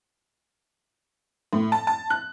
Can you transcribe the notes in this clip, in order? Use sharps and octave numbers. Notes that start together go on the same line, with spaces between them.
A2
A5
A5
F#6